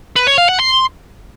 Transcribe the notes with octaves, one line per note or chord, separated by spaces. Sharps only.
B4
C#5
F5
F#5
C6